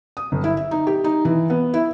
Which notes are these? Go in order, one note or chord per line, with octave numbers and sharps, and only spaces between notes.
D#6
G1
E4
E5
D#4
G4
D#4
E3
B3
E4